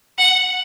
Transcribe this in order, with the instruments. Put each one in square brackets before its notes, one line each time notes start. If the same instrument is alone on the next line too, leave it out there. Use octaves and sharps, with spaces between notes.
[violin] F#5